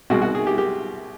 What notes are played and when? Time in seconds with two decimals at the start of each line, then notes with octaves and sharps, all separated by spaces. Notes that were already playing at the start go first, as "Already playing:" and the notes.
0.10 C2 B2 G#3 F#4
0.22 F#4
0.35 G#4
0.47 G4
0.58 G4